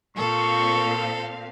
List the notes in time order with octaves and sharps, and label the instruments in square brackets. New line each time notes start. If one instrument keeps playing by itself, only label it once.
[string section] A#2 C4 F5 [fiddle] A4 [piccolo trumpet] C#6